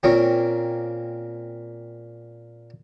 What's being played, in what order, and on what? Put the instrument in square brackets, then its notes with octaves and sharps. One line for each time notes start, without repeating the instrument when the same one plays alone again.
[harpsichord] A#2 A#3 C4 C#4